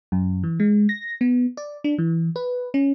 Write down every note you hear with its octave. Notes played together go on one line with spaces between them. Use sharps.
F#2
E3
G#3
A#6
B3
D5
D4
E3
B4
C#4